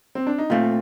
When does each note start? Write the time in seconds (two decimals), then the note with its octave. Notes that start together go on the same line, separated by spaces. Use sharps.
0.15 C4
0.27 D4
0.38 D#4
0.50 A#2 A3 C4 F4